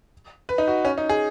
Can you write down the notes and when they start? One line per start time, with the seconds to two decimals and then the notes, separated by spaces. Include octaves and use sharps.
0.49 B4
0.58 D#4
0.68 F#4
0.85 C#4
0.98 D#4
1.09 G#4